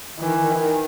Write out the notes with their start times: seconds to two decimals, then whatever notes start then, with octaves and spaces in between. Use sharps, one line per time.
0.18 D#3 E3
0.39 D#3
0.57 D#3